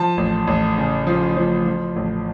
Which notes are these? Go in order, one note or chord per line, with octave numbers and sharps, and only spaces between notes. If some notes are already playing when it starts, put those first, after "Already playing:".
Already playing: F3 A5
A1
A1
C#3
F3
F3
F3
A1